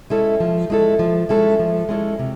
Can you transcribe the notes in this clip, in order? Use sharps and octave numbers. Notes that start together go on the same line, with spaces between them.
G#3 C#4 E4 A4
F3
G#3 C#4 E4 A4
F3
G#3 C#4 E4 A4
F3
G#3 C#4 E4 A4
C3